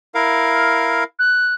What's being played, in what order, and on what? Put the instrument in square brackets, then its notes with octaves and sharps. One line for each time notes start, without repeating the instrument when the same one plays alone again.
[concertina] E4 A#4 F5
[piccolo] F#6